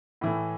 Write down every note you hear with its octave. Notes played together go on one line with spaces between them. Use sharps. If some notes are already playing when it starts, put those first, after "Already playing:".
A2 E3 A3